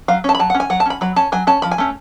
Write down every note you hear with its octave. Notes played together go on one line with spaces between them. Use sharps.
F#3 F5
C#4 A5
B5
F#3 A5
F#5
C#4
G#5
F#3 F#5
A5
C#4 B5
F#3 B5
C#4 A5
F#3 G#5
C#4 A5
F3 B5
G#5
A3 C#4